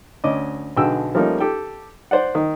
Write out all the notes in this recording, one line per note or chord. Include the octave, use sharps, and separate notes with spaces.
D2 C#4 D#5 D6
B1 D3 F#4 G#4 G5 E6
F3 G3 A3 A#3 C#4 D#4
G4 A4 G5
C5 D5 F#5
D#3